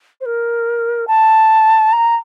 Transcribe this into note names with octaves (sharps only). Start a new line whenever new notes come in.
C5
A#4
A5
A#5